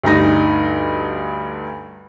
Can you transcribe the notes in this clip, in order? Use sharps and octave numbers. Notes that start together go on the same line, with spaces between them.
D2 G2 D#4 A#6